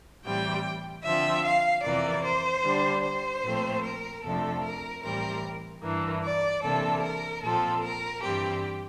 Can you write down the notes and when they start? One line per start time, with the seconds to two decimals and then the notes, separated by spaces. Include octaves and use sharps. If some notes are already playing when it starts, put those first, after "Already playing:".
0.24 A2 E3 G3 C4 G5
1.04 D3 F3 C4 E5
1.44 F5
1.83 F2 C3 E3 A#3 D5
2.24 C5
2.63 D3 G3 D4
3.03 C5
3.44 A#2 F3 A3 C4
3.83 A#4
4.23 F2 C3 F3 A3 D4 A4
4.63 A#4
5.03 A2 E3 G3 C4 A#4
5.83 G2 E3 A#3 D4
6.23 D5
6.63 C3 E3 A#3 D4 A4
7.03 A#4
7.43 A#2 F3 C4 A4
7.83 A#4
8.22 G2 E3 G3 C4 G4